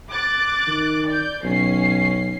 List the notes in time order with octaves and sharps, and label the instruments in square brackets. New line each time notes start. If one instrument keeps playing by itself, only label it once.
[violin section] D6 F#6 A6
[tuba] D#3
[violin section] D5 G6
[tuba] B1 [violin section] C#4 C7